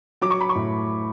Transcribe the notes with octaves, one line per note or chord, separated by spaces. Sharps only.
F#3 D6
C#6
B5
C#6
A2